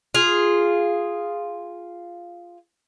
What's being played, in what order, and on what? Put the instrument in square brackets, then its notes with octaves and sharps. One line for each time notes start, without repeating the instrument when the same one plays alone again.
[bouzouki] F4 G#4